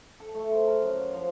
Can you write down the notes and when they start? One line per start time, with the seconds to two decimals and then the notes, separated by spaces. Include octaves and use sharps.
0.20 A4
0.35 A3
0.52 C5
0.67 A#4
0.82 F#2
1.00 F5
1.14 F3